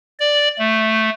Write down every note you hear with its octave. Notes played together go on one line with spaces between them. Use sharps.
D5
A3